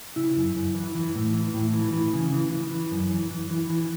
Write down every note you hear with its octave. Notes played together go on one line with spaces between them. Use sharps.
C#3 E4
F#2
F#2
E3
E3
A2
E3
A2
E3
E3
C#3
E3
E3
E3
F#2
E3
E3
E3
E3